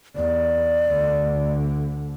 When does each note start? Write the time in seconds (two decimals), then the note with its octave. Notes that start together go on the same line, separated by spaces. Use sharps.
0.16 E2 D5
0.89 D2 D3